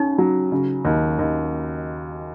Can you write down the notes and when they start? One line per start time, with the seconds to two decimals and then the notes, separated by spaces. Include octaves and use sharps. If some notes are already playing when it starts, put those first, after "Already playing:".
Already playing: C#3 C#4 D#4
0.18 F#3
0.52 C#3
0.85 D#2
1.19 D#2